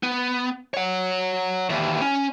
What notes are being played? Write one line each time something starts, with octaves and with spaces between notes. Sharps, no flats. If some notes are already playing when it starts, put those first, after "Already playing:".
B3
C#5 F#5
D#2 E3
C#4